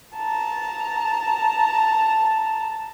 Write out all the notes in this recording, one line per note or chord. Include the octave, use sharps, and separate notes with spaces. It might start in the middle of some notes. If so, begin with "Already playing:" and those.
A5 A#5